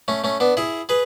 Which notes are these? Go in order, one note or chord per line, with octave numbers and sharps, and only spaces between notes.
A3 C#4
A3 C#4
B3 D4
E4 G#4
G#4 B4